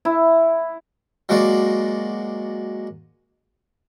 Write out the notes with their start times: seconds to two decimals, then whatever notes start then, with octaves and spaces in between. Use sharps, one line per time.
0.05 E4
1.29 F#3 G#3 A#3 F#4 D5